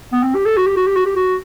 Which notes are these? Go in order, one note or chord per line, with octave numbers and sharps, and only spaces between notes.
B3
C4
G4
A4
F#4
G4
F#4
G4
F#4
G4
F#4